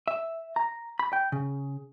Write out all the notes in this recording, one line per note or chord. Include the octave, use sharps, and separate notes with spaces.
E5
A#5
B5
G5
C#3